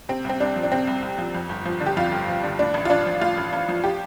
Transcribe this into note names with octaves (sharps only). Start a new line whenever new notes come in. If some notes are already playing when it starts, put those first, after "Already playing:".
C3 C4
C2 C4
C2 D4
F3
D4
C3 C4
C2
C2
F3
F2
G1
F3
D3
G4
F2 F4
G1
F3
D3
A2 D4
A1
F4
A1 D4
F3
A2 F4
A1
A1
F3
G4